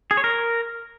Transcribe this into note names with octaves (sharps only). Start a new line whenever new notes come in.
G#4
C#5
A#4